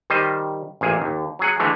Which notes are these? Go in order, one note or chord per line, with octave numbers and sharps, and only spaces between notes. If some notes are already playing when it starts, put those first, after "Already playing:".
D#3 G3 C5 D#5
A1 A#2 G#4
D#2
F#3 G#4 F#5
D3 E3 G#3 A3